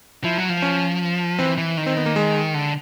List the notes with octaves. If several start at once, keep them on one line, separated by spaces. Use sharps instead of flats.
F3 E4
F#3
F3
C#4
E3 C4
E3
D#3
C4
B3
A#3
G#3
D3